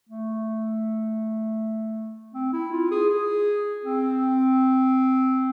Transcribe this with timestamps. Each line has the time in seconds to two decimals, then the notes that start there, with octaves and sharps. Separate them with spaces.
0.09 A3
2.34 C4
2.53 E4
2.72 F4
2.91 G#4
3.10 G#4
3.85 C4